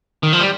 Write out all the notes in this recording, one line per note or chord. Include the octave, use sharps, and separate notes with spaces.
D#3
F3
G3